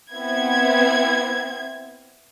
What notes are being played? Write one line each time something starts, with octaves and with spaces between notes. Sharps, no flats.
B3 C4 E4 G#6